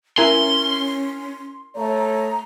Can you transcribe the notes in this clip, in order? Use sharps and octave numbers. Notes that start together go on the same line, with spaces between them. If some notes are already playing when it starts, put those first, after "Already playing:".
C#4 E4 A#4 G#5 C6
A3 C#5 A#5